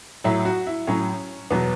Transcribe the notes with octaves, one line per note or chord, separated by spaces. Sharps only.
A2 F#3 E4
F#4
E4
A2 F#3 C#4
E2 B2 F#3 B3